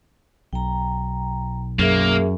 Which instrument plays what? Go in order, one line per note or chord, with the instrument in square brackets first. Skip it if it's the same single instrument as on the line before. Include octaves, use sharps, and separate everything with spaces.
[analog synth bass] B1 [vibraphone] G5 A#5
[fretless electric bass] F#2 [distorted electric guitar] A#3 [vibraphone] G#4 A#4 E5